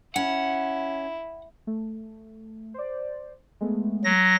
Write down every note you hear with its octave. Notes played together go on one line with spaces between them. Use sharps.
C#4 E4 F#5
A3
C5 D5
G#3 A3 B3
F#3 A#6